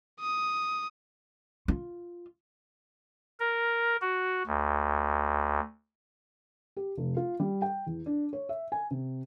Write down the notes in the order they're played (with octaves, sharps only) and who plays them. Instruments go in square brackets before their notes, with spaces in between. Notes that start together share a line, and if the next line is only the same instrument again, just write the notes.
[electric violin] D#6
[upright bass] F4
[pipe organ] A#4
F#4
D2
[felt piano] G4
F1
F4
G3
G5
E2
D4
C#5
E5
G#5
C3